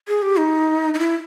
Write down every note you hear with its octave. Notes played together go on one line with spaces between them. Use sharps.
G#4
G4
D#4
D#4
E4